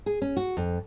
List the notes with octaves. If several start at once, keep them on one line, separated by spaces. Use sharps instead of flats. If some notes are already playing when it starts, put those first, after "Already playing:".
G#4
C#4
F#4
F2